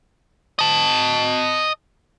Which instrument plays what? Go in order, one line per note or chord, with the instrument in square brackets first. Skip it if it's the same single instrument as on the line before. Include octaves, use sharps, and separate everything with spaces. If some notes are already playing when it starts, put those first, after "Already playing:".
[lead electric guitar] D#5 A5